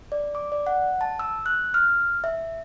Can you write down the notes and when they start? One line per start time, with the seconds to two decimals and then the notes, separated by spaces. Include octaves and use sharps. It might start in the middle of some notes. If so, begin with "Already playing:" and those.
0.12 D5
0.35 D6
0.52 D5
0.67 F#5
1.01 A5
1.19 E6
1.46 F#6
1.74 F6
2.24 E5